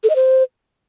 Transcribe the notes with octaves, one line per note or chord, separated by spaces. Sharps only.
A4
D#5
C5